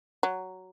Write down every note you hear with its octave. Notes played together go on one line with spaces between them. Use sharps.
F#3